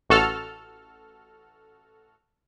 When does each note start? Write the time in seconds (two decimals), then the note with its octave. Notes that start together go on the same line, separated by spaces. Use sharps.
0.10 A1 F#4 A4 F6